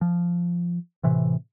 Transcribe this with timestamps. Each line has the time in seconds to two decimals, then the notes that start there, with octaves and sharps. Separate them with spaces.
0.01 F3
1.03 A2 C3 E3